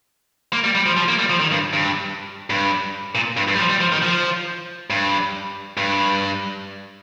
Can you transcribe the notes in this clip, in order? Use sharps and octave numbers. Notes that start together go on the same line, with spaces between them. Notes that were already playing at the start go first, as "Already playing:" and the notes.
A#3
G3
G3
F3
F3
A#3
G3
F3
D#3
G2
G2
G2
A#2
G2
G2
G3
F3
G3
F3
D#3
F3
G2
G2